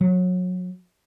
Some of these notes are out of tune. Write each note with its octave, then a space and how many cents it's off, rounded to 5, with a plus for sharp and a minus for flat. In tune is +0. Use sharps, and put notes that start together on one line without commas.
F#3 -25